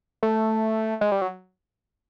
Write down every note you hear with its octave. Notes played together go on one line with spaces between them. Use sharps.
A3
G#3
G3
F#3